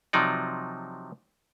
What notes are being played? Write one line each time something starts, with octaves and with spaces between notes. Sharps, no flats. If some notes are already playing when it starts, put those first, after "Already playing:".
C3 F3 F#3 D#4 D5